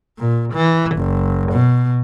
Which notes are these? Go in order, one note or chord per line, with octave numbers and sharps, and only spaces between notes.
A#2
E3
F#1
B2